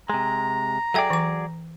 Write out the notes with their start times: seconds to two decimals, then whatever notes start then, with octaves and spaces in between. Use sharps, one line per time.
0.10 C3 G#3 A#5
0.94 F#3 G#4 A4 D5 E5 G5
1.10 E3 D6